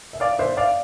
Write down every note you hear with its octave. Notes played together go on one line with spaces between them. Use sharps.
E5
D5 F5
C5 E5
D5 F5